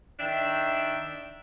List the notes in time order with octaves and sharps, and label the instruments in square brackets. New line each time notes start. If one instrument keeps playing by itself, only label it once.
[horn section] D#3 D4 E5 G5